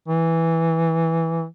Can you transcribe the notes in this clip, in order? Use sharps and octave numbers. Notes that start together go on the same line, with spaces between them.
E3